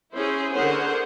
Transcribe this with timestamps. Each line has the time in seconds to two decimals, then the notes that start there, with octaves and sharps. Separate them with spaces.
0.15 C#4 E4 G#4 C5
0.54 D3 G#4 A#4 C5 C#5 F#5